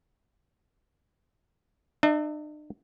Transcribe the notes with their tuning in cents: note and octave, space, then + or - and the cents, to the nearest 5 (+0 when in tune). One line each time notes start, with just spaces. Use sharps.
D4 +45 E5 -20